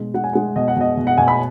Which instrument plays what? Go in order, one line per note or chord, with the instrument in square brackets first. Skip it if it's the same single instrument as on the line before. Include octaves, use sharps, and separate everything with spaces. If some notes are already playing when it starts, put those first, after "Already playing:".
Already playing: [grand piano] B2 G#3
G#3 F#5
G#5
G#3 F#5
B2 D#5
F#5
B2 D#5
B2
F#5
B2 G#5
B5